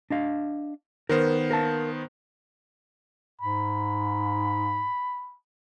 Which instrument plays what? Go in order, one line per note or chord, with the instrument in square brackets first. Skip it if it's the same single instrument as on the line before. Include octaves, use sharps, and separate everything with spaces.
[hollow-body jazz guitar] D4 D#5 F5
[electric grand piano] D#3 B3 C5 [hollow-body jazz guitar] A#4
[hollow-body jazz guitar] A#4 F5 A5
[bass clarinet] G#2 [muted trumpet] B5